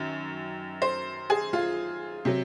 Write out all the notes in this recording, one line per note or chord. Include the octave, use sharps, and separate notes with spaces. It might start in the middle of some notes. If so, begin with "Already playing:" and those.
Already playing: F#2 D#3
C5
G#4
F4
C3 F#3